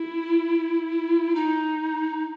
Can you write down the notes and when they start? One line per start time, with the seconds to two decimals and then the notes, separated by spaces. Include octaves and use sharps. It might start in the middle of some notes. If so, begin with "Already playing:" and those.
Already playing: E4
1.35 D#4